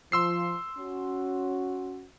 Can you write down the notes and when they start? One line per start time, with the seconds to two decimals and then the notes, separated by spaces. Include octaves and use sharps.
0.12 F3 C6 E6 C7
0.78 C#4 F#4